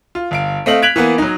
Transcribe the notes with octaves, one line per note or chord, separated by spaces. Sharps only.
F4
G1 F5 D7
A3 C4 D#5 F5 F#7
F#6 G#6 B6 D7 F7 F#7
E3 A#3 B3
F#3 D#4